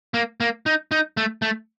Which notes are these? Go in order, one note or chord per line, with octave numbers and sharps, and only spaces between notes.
A#3
A#3
D#4
D#4
A3
A3